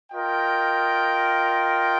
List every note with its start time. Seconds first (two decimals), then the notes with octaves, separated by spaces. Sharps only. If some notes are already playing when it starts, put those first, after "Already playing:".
0.12 F4 A#4 D#5 G5